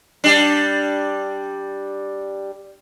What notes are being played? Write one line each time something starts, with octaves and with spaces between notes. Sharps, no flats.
G3 D4